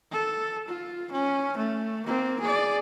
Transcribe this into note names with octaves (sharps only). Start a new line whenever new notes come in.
A4
F4
C#4
A3
A#3 C4
G#4 D5